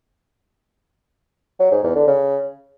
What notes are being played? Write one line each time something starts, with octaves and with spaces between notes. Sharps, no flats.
F#3
G#2
E2
D3
C#3